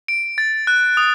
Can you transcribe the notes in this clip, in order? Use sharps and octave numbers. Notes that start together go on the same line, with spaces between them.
D7
A6
F#6
D#6